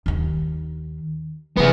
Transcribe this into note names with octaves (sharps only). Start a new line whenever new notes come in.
D#2 D#3
C3 D#3 B3 G#4